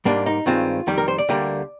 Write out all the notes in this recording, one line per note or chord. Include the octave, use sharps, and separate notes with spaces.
G#2 G3 A#3 D4
D#4
G2 D#3 G#3 C4 F4
F2 D#3 G3 G4
A#4
C5
D5
D2 D3 G3 A#3